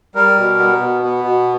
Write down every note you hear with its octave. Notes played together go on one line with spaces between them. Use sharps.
G3 A#4
B2
B3
B2
B3
B2